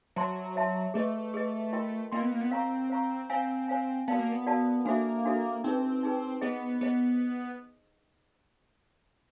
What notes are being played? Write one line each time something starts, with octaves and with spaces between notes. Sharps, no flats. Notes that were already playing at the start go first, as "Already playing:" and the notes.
F#3 C5 E5 A5 C6
C5 E5 A5 C6
A3 G#4 B4 D#5
G#4 B4 D#5
F4 A#4 D#5 G5 C6
A#3 F4 A#4 D#5 G5 C6
B3
A#3
B3
C4 C5 F5 A#5 C#6
C5 F5 A#5 C#6
C4 C5 F5 G#5
C5 F5 G#5
B3 F#4 A#4 D5 F5 A5
A#3
B3
F#4 A#4 D5 F5 A5
A#3 D4 F#4 A4 C5 E5
D4 F#4 A4 C5 E5
C4 D#4 G#4 B4
D#4 G#4 B4
B3 G#4 C5 D#5
B3 G#4 C5 D#5